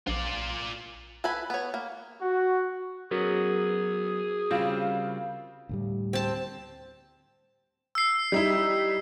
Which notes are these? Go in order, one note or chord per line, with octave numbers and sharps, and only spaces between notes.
A#1 F4 D5
A4 B4 F#5 G#5 B5
B3 C#5
A#3
F#4
F#3 B3 C#4 F#4 G#4 A#4
C#3 G3 C4 F4
D2 A2 G3
C4 A5
E6 C7
G3 D#4 E4